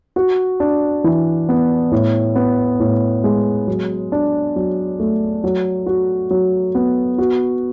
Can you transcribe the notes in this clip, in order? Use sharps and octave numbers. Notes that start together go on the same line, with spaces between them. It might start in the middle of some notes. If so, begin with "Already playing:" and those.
F#4
D4
E3
B3
A2
B3
A2
G#3
F#3
D4
F#3
A3
F#3
F#4
F#3
B3
F#4